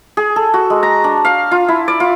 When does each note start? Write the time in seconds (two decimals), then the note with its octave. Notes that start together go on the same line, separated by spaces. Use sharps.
0.17 G#4
0.36 A4
0.54 F#4
0.70 G#3
0.83 A#5
1.04 D4
1.25 F5
1.51 F4
1.68 E4
1.88 D5
2.00 F4